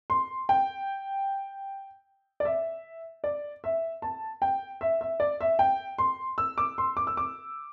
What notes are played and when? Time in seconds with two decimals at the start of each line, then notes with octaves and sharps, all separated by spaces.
0.10 C6
0.49 G5
2.40 D5
2.45 E5
3.24 D5
3.64 E5
4.02 A5
4.42 G5
4.81 E5
5.01 E5
5.20 D5
5.41 E5
5.59 G5
5.98 C6
6.38 E6
6.58 D6
6.78 C6
6.97 D6
7.07 E6
7.17 D6